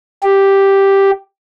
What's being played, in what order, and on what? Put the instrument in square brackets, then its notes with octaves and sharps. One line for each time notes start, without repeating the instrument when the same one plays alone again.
[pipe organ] G4